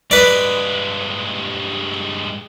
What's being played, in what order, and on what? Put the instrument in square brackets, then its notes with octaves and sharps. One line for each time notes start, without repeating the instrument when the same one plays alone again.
[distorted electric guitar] G2 G#3 [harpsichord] B4 D5